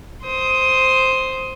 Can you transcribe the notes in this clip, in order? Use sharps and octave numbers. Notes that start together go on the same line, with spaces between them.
C5 D#6